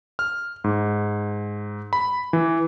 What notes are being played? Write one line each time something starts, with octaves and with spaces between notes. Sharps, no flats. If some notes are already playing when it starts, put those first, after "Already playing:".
F6
G#2
B5
E3